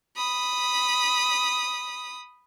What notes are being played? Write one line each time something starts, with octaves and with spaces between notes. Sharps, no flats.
B5 D#6